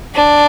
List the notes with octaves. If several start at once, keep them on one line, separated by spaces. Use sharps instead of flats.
D4